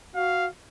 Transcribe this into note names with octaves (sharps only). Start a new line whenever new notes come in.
F#4 F5